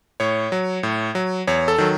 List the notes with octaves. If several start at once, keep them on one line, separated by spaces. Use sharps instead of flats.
A2 C#5
F#3
A2
F#3
E2 C#5
A4
D#3 F#3